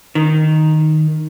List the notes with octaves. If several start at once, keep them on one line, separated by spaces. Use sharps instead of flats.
D#3